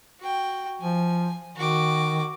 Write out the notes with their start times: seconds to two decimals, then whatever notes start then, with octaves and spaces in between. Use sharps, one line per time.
0.20 F#4 G5
0.82 F3 G#5
1.57 D#3 F#4 D6